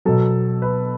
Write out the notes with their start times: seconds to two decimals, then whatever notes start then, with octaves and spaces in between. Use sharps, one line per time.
0.05 B2 F#3 A4
0.62 B4